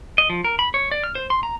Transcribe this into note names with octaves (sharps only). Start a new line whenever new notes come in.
D#5
F3
A#4
B5
C#5
D5
F6
C5
C6
A#5